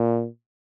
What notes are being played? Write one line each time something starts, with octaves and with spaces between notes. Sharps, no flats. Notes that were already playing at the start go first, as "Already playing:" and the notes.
Already playing: A#2